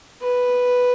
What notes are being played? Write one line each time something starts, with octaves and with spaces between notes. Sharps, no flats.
B4